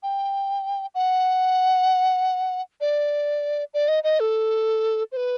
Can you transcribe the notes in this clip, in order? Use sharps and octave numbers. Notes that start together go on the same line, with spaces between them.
G5
F#5
D5
D5
D#5
D#5
A4
C5
B4